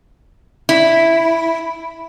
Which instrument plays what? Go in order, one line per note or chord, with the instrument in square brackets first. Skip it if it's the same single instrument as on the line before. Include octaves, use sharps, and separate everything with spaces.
[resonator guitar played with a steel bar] E4